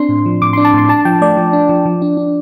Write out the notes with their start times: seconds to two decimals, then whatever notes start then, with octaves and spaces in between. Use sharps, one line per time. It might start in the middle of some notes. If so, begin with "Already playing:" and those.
Already playing: C4 D4 C6
0.09 A2
0.26 F3
0.42 A2 D6
0.53 D4 C6
0.65 A5
0.74 A2 C6
0.89 D4 A5
1.05 F3 G5
1.21 A3 D5
1.37 F3
1.53 D4
1.69 F3
1.85 F3
2.02 D4
2.17 D4